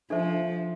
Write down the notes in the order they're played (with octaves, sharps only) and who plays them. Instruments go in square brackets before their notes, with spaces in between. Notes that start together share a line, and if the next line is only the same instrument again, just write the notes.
[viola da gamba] F3 [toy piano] D4 A4 C5 E5 A5